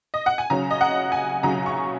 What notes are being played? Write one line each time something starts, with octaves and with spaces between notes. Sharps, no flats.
D#5
F#5
G#5
C#3 F#3 C#4 A#5
D#5
F#5
G#5
C#3 F#3 C#4 A#5
C#6